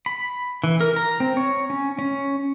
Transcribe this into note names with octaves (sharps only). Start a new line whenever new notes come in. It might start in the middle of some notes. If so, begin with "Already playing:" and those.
B5
E3
A#4
A#5
C4
C#5
C#4
C#4